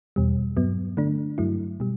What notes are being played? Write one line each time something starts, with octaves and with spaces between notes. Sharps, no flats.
E2 B2 G3
G2 F#3 B3
D3 A3 D4
G2 F#3 A3 E4
B2 G3